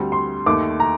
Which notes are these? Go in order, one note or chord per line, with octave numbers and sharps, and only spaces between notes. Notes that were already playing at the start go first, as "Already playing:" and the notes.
Already playing: D2 D3 G3 C4
C6
D#2 D#3 A3 D6
A#5